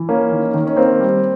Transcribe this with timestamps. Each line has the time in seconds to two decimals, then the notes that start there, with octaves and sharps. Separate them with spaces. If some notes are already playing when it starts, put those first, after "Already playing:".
Already playing: E3
0.09 A#3 C#4
0.32 D#3
0.54 D#3
0.67 C#4
0.76 A#3 C4
0.99 G3